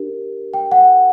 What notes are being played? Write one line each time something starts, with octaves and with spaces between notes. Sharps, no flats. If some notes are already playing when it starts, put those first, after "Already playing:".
Already playing: D4 G4 A#4
G5
F#5